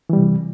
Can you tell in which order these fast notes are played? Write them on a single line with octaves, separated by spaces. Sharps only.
E3 G3 C3